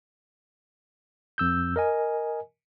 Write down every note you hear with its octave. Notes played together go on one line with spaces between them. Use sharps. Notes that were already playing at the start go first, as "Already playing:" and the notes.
F2 E6 G6
A#4 D#5 G#5